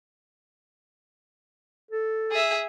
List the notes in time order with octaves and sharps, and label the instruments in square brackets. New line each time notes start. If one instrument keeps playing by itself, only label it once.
[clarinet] A4
[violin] G#4 E5